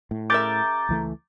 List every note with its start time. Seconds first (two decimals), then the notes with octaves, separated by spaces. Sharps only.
0.11 A2
0.30 C#3 A#4 E5 D6 G6 A6
0.89 C#2 E3 A3